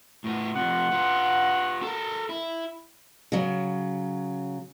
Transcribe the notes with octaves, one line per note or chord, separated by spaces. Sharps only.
A2 B3
C3 F3 F#5
B3 F4
A4 A#4
E4
C#3 F#3